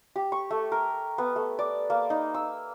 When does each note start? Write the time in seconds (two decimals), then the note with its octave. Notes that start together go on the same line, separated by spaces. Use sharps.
0.16 G4
0.32 C#6
0.51 A3
0.72 A#4
1.18 B3
1.36 A3
1.59 D5
1.90 A#3
2.10 D#4
2.34 E6